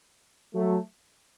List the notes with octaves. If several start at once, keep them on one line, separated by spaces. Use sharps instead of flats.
F#3 A3